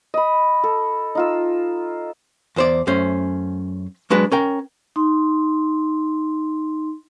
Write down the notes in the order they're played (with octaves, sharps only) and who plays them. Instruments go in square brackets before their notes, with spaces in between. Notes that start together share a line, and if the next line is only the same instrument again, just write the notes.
[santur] D#5 B5
A4
D#4 F4 E6
[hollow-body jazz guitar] E2 C5 D5
F#2 A3 C#4 C5
F#3 G#3 D4 B4
C#4 A#4 G5
[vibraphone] D#4 C6